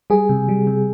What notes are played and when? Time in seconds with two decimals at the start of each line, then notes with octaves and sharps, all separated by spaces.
0.10 G3 G#4
0.29 C3
0.49 G3
0.67 C3